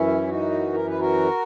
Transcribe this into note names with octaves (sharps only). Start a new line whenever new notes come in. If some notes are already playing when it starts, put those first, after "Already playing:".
Already playing: F#2 E3 C#4 E4
D#4 F#4
A#4
B4
F#4 A#4